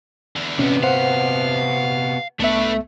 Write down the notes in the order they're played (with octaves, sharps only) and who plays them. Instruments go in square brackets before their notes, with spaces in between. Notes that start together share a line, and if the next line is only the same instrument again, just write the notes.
[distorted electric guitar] E2 D3
[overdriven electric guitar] C3 B3 [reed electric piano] C#4
[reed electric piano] C5 F#5 [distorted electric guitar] F5
[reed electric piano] C2 B3 E5 [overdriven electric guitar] A3 [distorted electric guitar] D4 B4